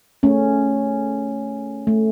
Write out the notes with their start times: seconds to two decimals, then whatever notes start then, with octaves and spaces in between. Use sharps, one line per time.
0.23 A3 C#4
1.87 A3